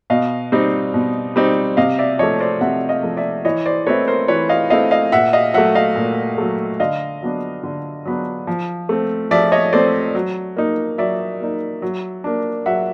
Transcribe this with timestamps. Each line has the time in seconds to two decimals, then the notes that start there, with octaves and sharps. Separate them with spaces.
0.10 B2 D#5 F5
0.52 G3 C4 D#4
0.94 B2
1.36 G3 C4 D#4
1.77 C3 D#5 F5
1.99 D5 E5
2.19 F3 A3 C#5 D#5
2.40 C5 D5
2.61 C3 E5 F#5
2.89 D#5 F5
3.03 F3 A3
3.17 D5 E5
3.45 E3 C#5 D#5
3.66 C5 D5
3.87 A3 C4 E4 B4 C#5
4.08 A#4 C5
4.28 E3 B4 C#5
4.49 D#5 F5
4.70 A3 C4 E4 D#5 F5
4.91 D#5 F5
5.12 A#2 E5 F#5
5.33 D#5 F5
5.54 F#3 A3 E5 F#5
5.75 D#5 F5
5.96 A#2
6.38 F#3 A3
6.80 D3 D#5 F5
7.22 F#3 B3 D4
7.63 D3
8.05 F#3 B3 D4
8.47 F3
8.89 A3 C4
9.31 F3 D5 E5
9.52 C#5 D#5
9.73 A3 C4 C5 D5
10.15 F#3
10.57 A#3 D#4
10.98 F#3 D5 E5
11.40 A#3 D#4
11.82 F#3
12.24 A#3 D4
12.66 F#3 E5 F#5